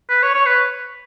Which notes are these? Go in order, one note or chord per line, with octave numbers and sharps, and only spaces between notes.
B4
C#5
C#5
B4